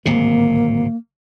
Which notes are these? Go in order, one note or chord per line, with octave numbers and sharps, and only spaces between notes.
D1 G#1 C3 A#3